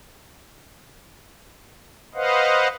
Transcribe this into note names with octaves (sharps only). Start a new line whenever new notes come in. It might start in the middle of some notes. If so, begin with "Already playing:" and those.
B4 C5 D#5 F5 F#5